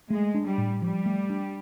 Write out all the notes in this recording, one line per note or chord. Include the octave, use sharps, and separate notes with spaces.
G#3 A3
D4
G3
A2
F3 G3
A3
D4